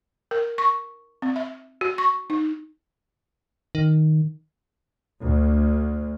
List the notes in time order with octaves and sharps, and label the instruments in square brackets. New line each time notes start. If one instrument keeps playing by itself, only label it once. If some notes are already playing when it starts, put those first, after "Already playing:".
[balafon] A#4
C#6
C4
E5
F#4
C#6
D#4
[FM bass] D#3
[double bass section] D2